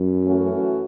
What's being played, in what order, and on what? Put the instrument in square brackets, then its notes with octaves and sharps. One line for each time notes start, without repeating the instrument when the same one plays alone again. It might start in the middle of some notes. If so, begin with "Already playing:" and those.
Already playing: [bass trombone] F#2
[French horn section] E3 A3 C#4 F#4